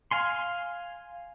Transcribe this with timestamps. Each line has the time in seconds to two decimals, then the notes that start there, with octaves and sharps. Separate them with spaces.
0.11 F5 G#5 C6